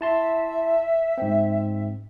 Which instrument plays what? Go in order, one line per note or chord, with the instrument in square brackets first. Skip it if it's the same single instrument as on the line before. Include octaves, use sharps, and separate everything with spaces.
[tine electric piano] E4 A5 C6 [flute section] E5
[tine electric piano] G#2 C4